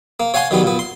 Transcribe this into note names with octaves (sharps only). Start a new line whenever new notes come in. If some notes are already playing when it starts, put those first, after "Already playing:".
A#3
C#5 F5 F#5 G#5 C6
D#3 F#3 G3 B3
A#2 B3
C6